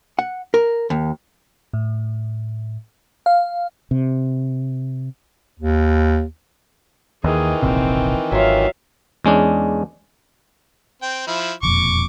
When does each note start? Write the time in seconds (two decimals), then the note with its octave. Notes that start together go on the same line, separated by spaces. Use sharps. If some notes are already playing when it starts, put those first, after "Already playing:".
0.19 F#5
0.54 A#4
0.90 D#2
1.73 A2
3.26 F5
3.91 C3
5.59 D#2
7.24 D#2 D#3 E3 G#4
7.63 E1 A#1 C3 C4
8.32 G#1 F#3 F4 E5 F5
9.25 E2 G#3 C#4 D4
11.02 C4 G5
11.27 F3 E4
11.63 E1 F2 A#2 C#6 D6